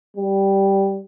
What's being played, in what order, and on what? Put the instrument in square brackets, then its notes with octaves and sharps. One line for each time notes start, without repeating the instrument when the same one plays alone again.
[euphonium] G3